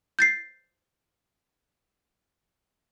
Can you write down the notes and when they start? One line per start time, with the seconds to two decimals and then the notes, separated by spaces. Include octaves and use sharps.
0.19 G6 A6 C7